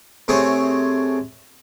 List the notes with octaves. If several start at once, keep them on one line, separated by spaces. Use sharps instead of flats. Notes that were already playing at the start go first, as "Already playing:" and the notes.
C3 A3 C4 G#4 C#5